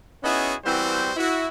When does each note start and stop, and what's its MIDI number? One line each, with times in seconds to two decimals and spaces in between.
0.23 0.54 59
0.23 0.54 61
0.23 0.54 63
0.23 0.54 64
0.23 0.54 66
0.23 0.54 68
0.65 1.12 52
0.65 1.12 55
0.65 1.12 59
0.65 1.12 60
0.65 1.12 66
0.65 1.12 72
1.17 1.46 64
1.17 1.46 66